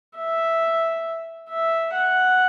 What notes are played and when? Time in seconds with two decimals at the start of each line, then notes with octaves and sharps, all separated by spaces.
0.17 E5
1.49 E5
1.93 F#5